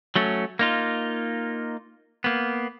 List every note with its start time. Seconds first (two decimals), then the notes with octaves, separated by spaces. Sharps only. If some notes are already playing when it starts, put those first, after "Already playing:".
0.16 F#3 A3 C#4
0.59 A#3 D#4 F4
2.24 A#3 B3